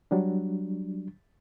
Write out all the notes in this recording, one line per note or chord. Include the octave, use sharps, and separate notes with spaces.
F#3 G3 D4